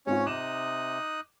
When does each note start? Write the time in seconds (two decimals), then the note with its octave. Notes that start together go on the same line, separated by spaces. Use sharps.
0.07 G#2 C4 C#4 F4 C#5
0.26 C3 D#4 D6 D#6 F#6 E7